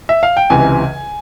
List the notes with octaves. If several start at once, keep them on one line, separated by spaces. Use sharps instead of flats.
E5
F5
G5
C#2 C3 E3 G#5